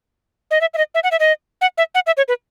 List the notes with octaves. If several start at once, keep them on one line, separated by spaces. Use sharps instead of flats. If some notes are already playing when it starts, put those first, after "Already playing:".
D#5
E5
E5
D#5
E5
F#5
E5
D#5
F#5
E5
F#5
E5
C#5
B4